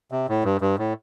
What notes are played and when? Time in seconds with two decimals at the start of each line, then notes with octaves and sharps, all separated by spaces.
0.12 C3
0.29 A2
0.44 G2
0.61 G2
0.79 A2